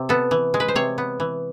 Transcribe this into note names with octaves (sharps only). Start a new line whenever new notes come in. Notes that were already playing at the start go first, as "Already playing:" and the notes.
Already playing: C3
B3 A4
E3
G#3
B4
C5
C3 C#5
B3
E3